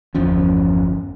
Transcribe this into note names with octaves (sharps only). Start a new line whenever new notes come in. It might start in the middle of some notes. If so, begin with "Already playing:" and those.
G1 E2 F3 C#4